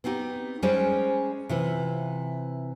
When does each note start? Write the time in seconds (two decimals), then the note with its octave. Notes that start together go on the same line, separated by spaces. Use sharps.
0.04 B3 C4 D#4 F#4 G4
0.62 G3 G#3 C#4 G#4 C5 D5
1.49 C3 E3 F4 B4